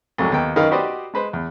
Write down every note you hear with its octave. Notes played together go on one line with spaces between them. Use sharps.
C2 F2 G#2 F#3
D#2 B3 G5
F#2 D#3 D#4 B4 F5
F#4 G4 B4 C5 D5 D#5
G#3 B4 C5
E2